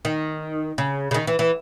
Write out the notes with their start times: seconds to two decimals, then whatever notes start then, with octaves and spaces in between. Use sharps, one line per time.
0.05 D#3
0.78 C#3
1.11 C#3
1.14 D#3
1.27 E3
1.39 E3